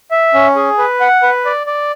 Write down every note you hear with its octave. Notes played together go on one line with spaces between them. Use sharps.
E5
C#4
G#4
B4
F#5
B4
D5
D5